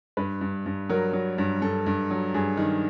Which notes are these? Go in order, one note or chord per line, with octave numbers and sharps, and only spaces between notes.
G2 B4
G2
G2
F#3 A#4
F#3
G2
G2 A4
G2
F#3
G2 G#4
D#3